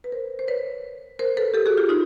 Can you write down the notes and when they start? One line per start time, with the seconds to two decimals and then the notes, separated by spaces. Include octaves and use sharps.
0.04 B4
0.12 A#4 C5
0.39 C5
0.48 B4 C#5
1.19 A#4 C5
1.37 A4 B4
1.54 G4 A4
1.66 F#4 G#4
1.77 F4 G4
1.89 D#4 F4